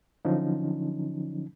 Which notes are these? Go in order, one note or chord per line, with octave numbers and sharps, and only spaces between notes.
D3 F3 F#3 C#4 D#4